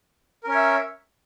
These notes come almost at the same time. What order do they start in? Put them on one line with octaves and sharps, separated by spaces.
A#4 C#4 C#5 E5